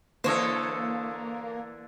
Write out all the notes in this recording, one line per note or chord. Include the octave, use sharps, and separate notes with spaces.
D3 E3 A#3 A4 C5 C#5 D#5